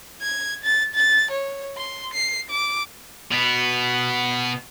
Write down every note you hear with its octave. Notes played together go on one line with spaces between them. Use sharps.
G#6
A6
A6
C#5
C6
C7
D6
B2 B3